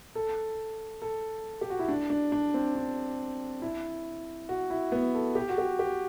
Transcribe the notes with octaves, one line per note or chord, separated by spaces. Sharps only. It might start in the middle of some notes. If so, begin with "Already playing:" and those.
A4
A4
G4
F#4
E4
D4
D4
D4
C4
D4
E4
F#4
E4
B3
A4
G4
F#4
G4
G4